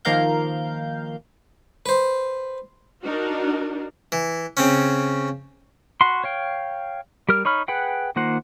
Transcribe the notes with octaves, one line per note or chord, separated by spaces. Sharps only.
D#3 F3 A#3 A#4 F5 G6
B4 C5
D4 D#4 F#4 A#4
E3
C#3 C4 C#4
F#4 F#5 B5 C6
C#5 F5 G5
G3 G4 A#4 F6
D#4 C#5 B5 F6
G#4 B4 F#5 G5
D#3 A#3 F4 C5 F#5